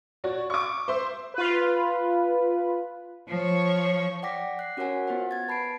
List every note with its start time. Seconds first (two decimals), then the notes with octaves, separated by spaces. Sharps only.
0.24 F#4 C#5 D5
0.50 C#6 D6
0.88 C5 E5 C6
1.34 F4 B4
3.28 F3 C#5
4.23 D5 F#5 G5 D6 A#6 B6
4.59 F#6 C7
4.77 C#4 F#4 A#4 C#5 F#5 G#5
5.07 B3 F4 C5 F#5
5.31 G#6 A6
5.48 B4 A5 B5 C7 D7